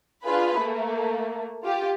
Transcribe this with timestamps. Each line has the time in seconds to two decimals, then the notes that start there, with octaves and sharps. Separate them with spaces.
0.24 D4 F4 G#4 B4 B5
0.56 A3 A#3
1.63 F4 G4